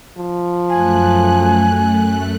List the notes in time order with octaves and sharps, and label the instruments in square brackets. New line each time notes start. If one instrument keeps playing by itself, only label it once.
[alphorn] F3
[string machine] F#2 A3 F#6 [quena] G#5